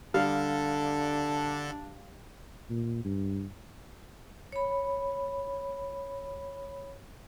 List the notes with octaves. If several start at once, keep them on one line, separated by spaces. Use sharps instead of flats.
D3 G3 D4 A4 F5
A#2
G2
C#5 B5